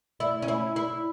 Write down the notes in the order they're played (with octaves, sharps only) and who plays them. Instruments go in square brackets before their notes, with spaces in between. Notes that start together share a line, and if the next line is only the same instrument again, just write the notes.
[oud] E4
C#4
E4
E4